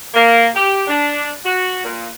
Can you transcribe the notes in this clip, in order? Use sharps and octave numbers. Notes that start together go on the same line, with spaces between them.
A#3
G4
D4
F#4
A#2